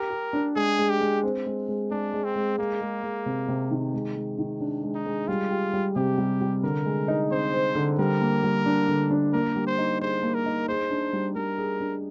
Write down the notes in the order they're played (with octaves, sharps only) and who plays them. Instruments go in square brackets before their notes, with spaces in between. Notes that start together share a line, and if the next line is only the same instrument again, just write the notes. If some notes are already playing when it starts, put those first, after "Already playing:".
Already playing: [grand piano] G4 [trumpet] A#4
[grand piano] G4
D4
[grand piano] G#3 [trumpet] G#4
[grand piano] G#3
[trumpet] G4
[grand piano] G#3
C4
G#3
G#3
[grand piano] G#3 [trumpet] D4
[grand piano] G#3
[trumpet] C4
[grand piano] G#3
[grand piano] G#3 [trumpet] A#3
[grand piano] G#3
G#3
C3
C3
D#3
G#3
G#3
D#3
D4
G#3
[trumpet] D#4
[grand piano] G#3
[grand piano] G3 [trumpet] F4
[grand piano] G4
G3
[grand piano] C3 [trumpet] G4
[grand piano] G3
G3
[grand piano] D3 [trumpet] A#4
[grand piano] G#3
D#4
[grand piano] C4 [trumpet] C5
[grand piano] C4
D3
[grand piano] G3 [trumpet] A#4
[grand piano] A#3
G3
D4
D3
D4
[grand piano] A#3 [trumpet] A#4
[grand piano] G3
[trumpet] C5
[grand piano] D#4
[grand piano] G#4 [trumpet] C5
[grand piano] A#3
[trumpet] A#4
[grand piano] D#4
[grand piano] G#4 [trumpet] C5
[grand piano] D4
G3
[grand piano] G3 [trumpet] A#4
[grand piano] G#4
D4